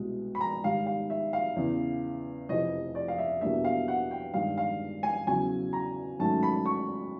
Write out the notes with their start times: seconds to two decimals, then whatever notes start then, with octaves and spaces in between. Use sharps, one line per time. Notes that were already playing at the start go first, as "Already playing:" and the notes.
Already playing: C2 B2 G#3
0.35 B5
0.41 A#5
0.64 G#2 D#3 G3 F5
0.86 F5
1.10 E5
1.33 F5
1.56 E2 C#3 E3
2.49 F1 F2 C3 E3 D#5
2.95 D5
3.08 F5
3.18 E5
3.41 E2 B2 G3 A#3 D4 E5
3.65 F5
3.88 F#5
4.11 G5
4.34 G2 D#3 G#3 F5
4.58 F5
5.03 G#5
5.27 E2 C#3 F#3 G#5
5.73 A#5
6.19 G#2 D#3 F#3 A3 C#4 A5
6.43 B5
6.66 C#6